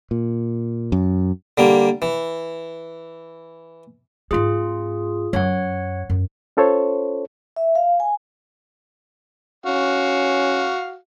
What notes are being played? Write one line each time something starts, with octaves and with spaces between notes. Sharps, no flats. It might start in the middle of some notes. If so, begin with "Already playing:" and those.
A#2
F#2
D3 G3 A#3
E3
G#2 C4 F4 G#4
F#2 C#5 F#5
F#2
C#4 F4 A4 C5 C#5
E5
F5
G#5
C#4 F#4 F5